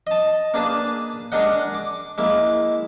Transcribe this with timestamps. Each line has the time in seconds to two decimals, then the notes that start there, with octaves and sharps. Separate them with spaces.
0.07 D#5 A5
0.54 A#3 D4 G#4 B4 A5
1.32 G#3 D4 G#4 A#4 D#5 F#5
1.75 D6
2.18 G#3 A#3 E4